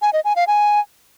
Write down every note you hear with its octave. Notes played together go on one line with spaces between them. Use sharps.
G#5
D#5
G#5
F5
G#5